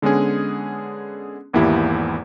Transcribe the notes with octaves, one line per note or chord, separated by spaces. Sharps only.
D3 G#3 B3 C#4 G#4
G#1 E2 A#3 E4 G4